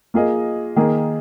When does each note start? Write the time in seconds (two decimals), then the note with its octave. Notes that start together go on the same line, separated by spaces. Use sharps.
0.14 A#3 F4 G#4 D#5
0.76 D#3 A#3 G#4